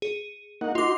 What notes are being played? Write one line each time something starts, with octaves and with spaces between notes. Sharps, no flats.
G#4
A#3 D#4 F#5
D#4 F4 F#4 C6 D6